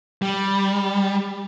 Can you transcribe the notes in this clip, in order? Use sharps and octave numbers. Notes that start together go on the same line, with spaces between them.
G3